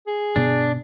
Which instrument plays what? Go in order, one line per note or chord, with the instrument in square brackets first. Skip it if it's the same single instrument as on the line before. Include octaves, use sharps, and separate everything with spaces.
[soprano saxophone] G#4
[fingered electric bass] G1 B2 B3 [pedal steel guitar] D4